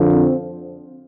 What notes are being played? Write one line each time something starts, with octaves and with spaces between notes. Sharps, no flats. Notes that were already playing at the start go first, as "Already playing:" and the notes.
Already playing: F2 D3 F3
C4